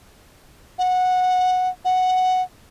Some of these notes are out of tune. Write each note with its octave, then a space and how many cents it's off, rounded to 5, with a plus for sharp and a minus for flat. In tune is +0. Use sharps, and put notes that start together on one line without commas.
F#5 -15
F#5 +0